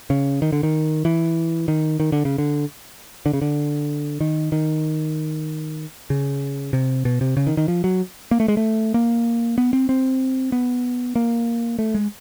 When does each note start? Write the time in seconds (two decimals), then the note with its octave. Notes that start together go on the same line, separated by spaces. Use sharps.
0.10 C#3
0.42 D#3
0.52 D3
0.63 D#3
1.05 E3
1.68 D#3
2.00 D#3
2.12 D3
2.25 C#3
2.38 D3
3.26 D3
3.33 C#3
3.42 D3
4.21 D#3
4.52 D#3
6.10 C#3
6.73 C3
7.05 B2
7.21 C3
7.37 C#3
7.47 D#3
7.57 D#3
7.68 F3
7.84 F#3
8.31 A#3
8.40 A3
8.48 G#3
8.57 A3
8.94 A#3
9.58 B3
9.73 C4
9.89 C4
10.52 B3
11.16 A#3
11.79 A3
11.95 G#3